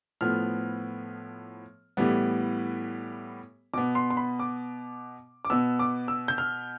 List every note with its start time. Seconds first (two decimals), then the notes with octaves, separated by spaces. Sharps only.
0.21 A2 F3 B3 F6
1.97 A2 E3 G3 B3
3.74 B2 B3 D6
3.95 C6
4.10 C6
4.17 B5
4.40 D6
5.45 D6
5.50 B2 B3 E6
5.79 D6
6.08 E6
6.28 G6
6.38 F6